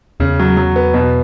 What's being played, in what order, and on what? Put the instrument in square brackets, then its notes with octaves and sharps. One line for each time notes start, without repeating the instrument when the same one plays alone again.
[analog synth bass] E2 [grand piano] C#3
[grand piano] F#3
F#3
B3
B2